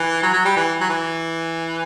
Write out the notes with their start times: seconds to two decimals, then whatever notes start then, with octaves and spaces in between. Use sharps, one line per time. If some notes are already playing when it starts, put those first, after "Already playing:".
Already playing: E3
0.23 F#3
0.33 F#3
0.45 G3
0.56 E3
0.80 F#3
0.89 E3